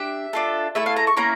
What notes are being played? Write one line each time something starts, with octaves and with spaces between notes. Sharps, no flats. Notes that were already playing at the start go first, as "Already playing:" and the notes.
Already playing: D4 G4 E5
D4 F4 A4
A3 E4 A4 E5
F5
A#5
C#6
A#3 C#4 E4 A#5